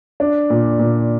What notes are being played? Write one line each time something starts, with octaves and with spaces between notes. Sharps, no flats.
D4
A#2
A#2